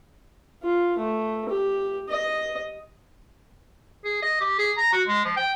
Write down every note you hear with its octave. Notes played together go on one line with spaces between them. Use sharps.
F4
A3
G4
D#5
G#4
D#5
G4
G#4
A#5
F#4
G#3
F3
G5